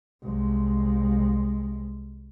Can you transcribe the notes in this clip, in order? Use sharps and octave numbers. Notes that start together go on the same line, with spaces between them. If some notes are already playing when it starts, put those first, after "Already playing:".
C2 G#3